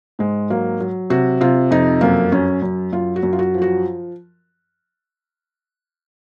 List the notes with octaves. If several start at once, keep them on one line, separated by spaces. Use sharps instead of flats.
G#2 G#3
F#3 A#3
F#3
C3 F#4
C3 F4
F2 D#4
F#2 A#3
F#2 C#4
F#2
F#2 F4
F#4
F#2
F4
F#4
F3
F#4